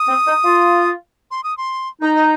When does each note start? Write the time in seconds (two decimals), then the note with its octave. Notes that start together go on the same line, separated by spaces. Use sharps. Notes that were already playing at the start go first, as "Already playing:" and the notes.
Already playing: D#6
0.08 C4
0.26 D#4
0.44 F4
1.31 C6
1.44 D#6
1.58 C6
2.01 D#4 A#5
2.15 D#5